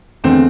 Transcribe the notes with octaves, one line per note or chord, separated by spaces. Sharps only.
E2 D3 A3 C4